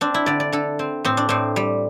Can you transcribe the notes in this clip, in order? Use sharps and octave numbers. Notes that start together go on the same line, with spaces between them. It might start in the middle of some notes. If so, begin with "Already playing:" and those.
C4 D4
E4
D3 D5
D5
D3 A4
C4
A2 C4
D4
A2 C4
G3